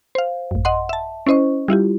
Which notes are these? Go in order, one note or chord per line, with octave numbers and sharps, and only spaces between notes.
C5 F5
A1 F#2
D#5 F#5 C6
E5 A5
C#4 E4 C5 D#5 C#6
G3 E4 F4 G4